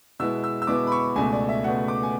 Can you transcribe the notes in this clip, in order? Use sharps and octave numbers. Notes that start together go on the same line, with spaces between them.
B2 G#3 B3 E4 E6
E6
E6
B2 G#3 B3 E4 D6
B5
C#6
C#2 B2 A3 G#5
D5
E5
C#2 B2 A3 F#5
D6
G#5